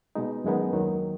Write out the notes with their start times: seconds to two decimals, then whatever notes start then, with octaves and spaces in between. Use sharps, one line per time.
0.15 B2 G#3 D#4
0.44 F#2 D#3 G#3 B3 D#4
0.73 D#2 D#3 F#3